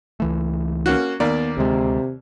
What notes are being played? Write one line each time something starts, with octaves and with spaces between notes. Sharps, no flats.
C#2 E3 A3
A#3 C#4 F#4
D#2 A#3 B3 D5
D2 C3 G#3